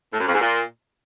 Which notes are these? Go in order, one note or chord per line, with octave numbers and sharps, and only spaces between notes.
A2
F#2
F2
G#2
A#2